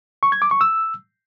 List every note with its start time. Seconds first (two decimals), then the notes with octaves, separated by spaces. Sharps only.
0.23 C#6
0.32 G#6
0.42 D6
0.51 C#6
0.61 E6